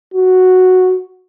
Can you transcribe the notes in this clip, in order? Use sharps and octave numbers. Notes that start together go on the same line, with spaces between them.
F#4